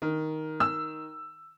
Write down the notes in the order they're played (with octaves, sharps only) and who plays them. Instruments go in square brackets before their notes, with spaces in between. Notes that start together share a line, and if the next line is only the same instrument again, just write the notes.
[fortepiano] D#3
[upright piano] E6